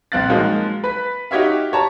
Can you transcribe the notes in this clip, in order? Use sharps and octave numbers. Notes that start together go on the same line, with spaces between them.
A#1 C4 F5 F#6 A6
F3 F#3 G#3 A#3 D#4 F4
B4 B6
D#4 F#4 G4 C#5 E5 F5
G4 C#5 A5 A#5